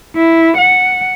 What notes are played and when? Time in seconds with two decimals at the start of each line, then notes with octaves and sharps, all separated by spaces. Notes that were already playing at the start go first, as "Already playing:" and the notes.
0.16 E4
0.58 F#5